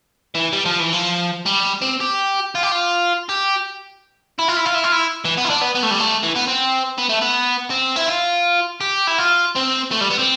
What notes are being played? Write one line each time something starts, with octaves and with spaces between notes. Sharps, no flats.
E3
G3
F3
E3
F3
G3
C4
G4
F4
G4
F4
G4
E4
F4
E4
F4
E4
F4
E4
E3
B3
E4
D4
B3
B3
A3
G3
A3
E3
B3
C4
B3
A3
B3
C4
E4
F4
G4
E4
F4
C4
A3
G3
B3
C4